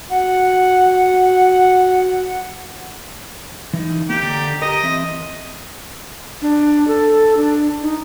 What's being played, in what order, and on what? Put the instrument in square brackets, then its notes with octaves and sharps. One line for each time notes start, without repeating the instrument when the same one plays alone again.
[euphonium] F#4 [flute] F#5
[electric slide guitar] E3 D#4
[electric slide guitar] A#3 [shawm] G4
[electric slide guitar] D3 D5 A#5
[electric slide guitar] G4 A#4 [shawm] D#5
[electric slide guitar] E3 C4 E5
[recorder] D4
A4
D4
D#4